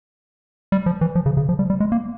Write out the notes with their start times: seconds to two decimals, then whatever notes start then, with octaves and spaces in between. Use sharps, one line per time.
0.72 G3
0.86 F3
1.01 E3
1.15 F3
1.26 C#3
1.37 C#3
1.49 F3
1.59 G3
1.70 G3
1.80 G#3
1.92 A#3